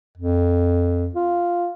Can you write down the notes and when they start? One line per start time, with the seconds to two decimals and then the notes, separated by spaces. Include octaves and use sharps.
0.17 F2
1.15 F4